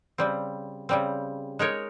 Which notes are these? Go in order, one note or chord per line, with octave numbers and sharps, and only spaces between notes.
C#3 G3 C4
C#3 G3 C4
G#3 D#4 A#4 C#5